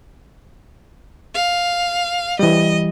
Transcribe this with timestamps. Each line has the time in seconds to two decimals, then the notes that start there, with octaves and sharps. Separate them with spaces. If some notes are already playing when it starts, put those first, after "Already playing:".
1.34 F5
2.39 E3 G3 D#5